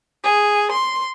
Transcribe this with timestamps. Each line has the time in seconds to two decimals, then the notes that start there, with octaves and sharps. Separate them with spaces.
0.24 G#4
0.72 C6